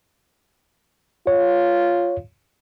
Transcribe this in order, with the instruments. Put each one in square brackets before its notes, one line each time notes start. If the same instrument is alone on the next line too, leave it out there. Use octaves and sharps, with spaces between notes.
[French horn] F4 [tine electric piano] C#5